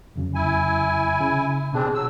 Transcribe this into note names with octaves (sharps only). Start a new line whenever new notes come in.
F2 C#3 F#3
E4 G#5
C#3
D#2 B2 C4 D4 G#4
F#3 E6